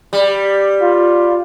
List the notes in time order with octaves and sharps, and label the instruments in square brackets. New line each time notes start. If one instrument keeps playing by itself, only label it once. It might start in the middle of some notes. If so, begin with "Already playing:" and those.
[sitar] G3
[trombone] F4